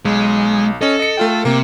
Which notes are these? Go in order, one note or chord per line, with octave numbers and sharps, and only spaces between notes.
B1 G#3
C#4 A4 D#5
D#5 C#7
A3 F4 G5
C3 A#3 G4